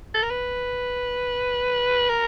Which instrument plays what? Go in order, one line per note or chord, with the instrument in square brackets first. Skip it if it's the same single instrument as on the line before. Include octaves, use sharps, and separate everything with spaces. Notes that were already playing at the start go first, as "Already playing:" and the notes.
[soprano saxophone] A4
A#4
B4
A#4